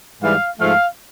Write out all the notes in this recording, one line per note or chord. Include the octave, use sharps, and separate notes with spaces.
G#2 E3 G3 F5
G#2 F3 A3 F5